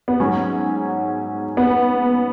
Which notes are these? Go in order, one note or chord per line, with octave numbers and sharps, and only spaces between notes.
B3
G#2 F#3 C#4
B3